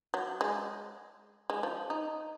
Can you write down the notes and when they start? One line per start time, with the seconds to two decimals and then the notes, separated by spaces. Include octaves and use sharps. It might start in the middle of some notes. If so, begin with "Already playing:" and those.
0.14 F#3
0.41 G#3
1.50 G#3
1.63 F3
1.90 D#4